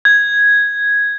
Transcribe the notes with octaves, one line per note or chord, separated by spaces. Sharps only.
G#6